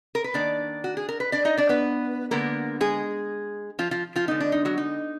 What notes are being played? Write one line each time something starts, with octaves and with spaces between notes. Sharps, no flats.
A#4
B4
D#3 A#3 D4 D5
F#4
G#4
A#4
B4
D4 D5
D#4 D#5
D4 D5
B3 B4
D3 G#3 A#3 B3 A#4
G#3 G#4
F3 F4
F3 F4
F3 F4
D3 G#3 B3 D#4
D4
D#4
F#3 F#4
D#4